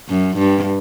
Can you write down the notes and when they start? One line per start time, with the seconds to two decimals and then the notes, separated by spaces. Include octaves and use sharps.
0.09 F#2
0.37 G2